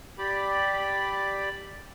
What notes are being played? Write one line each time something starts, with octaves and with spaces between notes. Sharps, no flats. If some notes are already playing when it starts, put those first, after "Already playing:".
G4 D5 B5